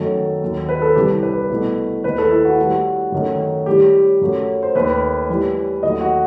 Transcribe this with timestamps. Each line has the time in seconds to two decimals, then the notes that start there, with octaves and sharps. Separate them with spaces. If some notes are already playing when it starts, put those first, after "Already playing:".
Already playing: F#2 D#3 F#3 A3 A4
0.42 D#2 D#3 F#3
0.69 B4
0.82 A4
0.96 C2 C3 E3 G3 G4
1.23 B4
1.50 C2 B2 A3
2.04 D#2 D#3 A3 B4
2.18 A4
2.31 E4
2.45 F#4
2.58 A2 G3
3.12 F#2 D#3 A3
3.66 A2 G3 G4
4.21 F#2 F#3 A3
4.63 C5
4.75 D#2 D#3 A3 B4
5.29 A2 E3 G3
5.83 D#2 D#3 F#3 A3 D#5
6.01 F#4